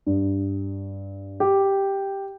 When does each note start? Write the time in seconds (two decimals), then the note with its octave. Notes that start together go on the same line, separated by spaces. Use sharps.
0.06 G2
1.40 G4